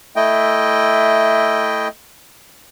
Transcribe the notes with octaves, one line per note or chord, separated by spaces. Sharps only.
A3 E4 D#5 G5